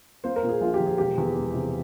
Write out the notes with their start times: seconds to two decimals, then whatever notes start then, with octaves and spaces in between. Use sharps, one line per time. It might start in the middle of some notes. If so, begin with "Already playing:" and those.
0.24 A#3 C5
0.36 A#4
0.43 A#2
0.49 G#4
0.61 A#1 F4
0.74 G4
0.80 F3
0.87 G#4
0.98 E1 G4
1.17 E2
1.36 E1
1.54 C3